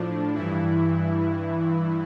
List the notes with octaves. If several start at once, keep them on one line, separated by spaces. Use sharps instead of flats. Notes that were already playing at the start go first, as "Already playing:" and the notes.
Already playing: A2 F3 D4
G2 E3 E4